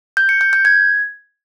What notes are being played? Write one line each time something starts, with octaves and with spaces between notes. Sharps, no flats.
G6
C#7
G6
G6
G#6